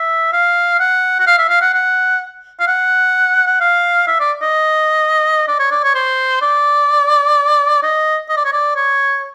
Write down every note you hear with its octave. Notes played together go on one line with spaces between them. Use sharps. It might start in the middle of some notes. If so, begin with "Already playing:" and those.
Already playing: E5
F5
F#5
F#5
F5
E5
F5
F#5
F#5
F5
F#5
F#5
F5
E5
D5
D#5
D5
C#5
D5
C#5
C5
D5
D#5
D#5
D5
C#5
D5
C#5